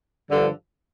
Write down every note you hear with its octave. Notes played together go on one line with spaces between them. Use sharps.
G2 D3 F3